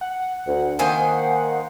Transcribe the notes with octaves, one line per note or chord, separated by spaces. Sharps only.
F#5
D2
D#3 A#3 C5 G#5